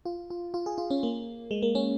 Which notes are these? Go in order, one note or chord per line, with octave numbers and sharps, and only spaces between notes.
F4
F4
F4
G#4
F4
C#4
A#3
G#3
A#3
C#4